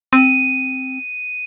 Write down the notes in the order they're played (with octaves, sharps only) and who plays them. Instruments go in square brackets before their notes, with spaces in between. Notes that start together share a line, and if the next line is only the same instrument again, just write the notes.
[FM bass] C4 [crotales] D#7